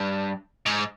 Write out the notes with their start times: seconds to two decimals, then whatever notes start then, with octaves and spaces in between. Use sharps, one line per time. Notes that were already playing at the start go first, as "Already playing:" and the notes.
Already playing: G2
0.66 G#2